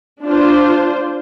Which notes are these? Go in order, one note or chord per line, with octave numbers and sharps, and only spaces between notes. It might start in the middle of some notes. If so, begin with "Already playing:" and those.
D4 F4 C5